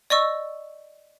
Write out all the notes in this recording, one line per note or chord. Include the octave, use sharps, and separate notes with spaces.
D5 D#5 C#6 E6